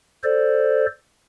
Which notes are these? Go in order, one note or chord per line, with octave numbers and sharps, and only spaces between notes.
A4 C5 D5